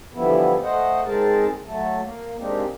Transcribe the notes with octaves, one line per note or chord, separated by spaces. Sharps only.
D3 E3 F3 G3 B3 E4
A3 C5 D#5 F#5
G#3 C4 D#4 G#4 A#4 A5
F#3 A3 A4
A#3
G#3 A#3 C4 D4 D#4 G4